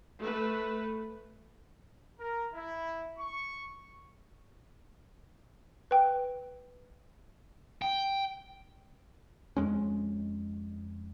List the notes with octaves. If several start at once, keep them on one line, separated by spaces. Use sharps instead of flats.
A3 B4
A#4
E4
C#6
B4 G5
G5
F2 G#3 C#4